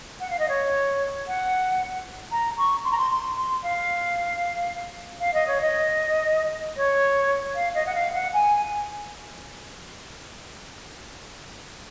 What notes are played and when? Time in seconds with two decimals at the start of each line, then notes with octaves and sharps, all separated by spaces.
0.20 F#5
0.29 F5
0.39 D#5
0.48 C#5
1.27 F#5
2.31 A#5
2.57 C#6
2.84 C6
2.91 A#5
2.98 C6
3.10 C6
3.36 C6
3.62 F5
5.19 F5
5.33 D#5
5.47 C#5
5.61 D#5
6.76 C#5
7.55 F5
7.74 D#5
7.86 F#5
7.94 F5
8.13 F#5
8.33 G#5